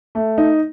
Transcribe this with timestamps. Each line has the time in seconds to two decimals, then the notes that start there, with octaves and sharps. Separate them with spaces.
0.15 A3
0.38 D#4